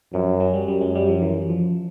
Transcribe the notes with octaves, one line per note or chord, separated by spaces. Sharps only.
F#2 F3
F#3
F#3
G3
F#2 G3
G#3
G3
F3
E3
F3